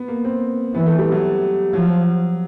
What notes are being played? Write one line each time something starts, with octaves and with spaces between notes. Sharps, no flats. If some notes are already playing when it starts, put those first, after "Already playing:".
Already playing: B3
A#3
C4
E3 B3
A3
G3
F#3
F3 F#3